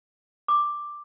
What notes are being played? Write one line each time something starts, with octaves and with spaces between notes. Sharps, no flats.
D6